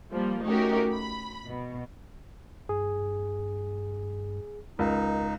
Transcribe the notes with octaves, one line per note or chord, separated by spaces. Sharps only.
F3 G3 A#3
A3 C#4 D#4 F#4 G4 A#4
B5
B2
G2 G#4
C#2 D#4 A#4